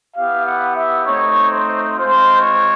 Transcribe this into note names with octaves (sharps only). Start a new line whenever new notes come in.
B3 E4 G4 F5
F#5
E5
A3 C4 D#4 C#5
C5
G#3 C4 F4 C5
C#5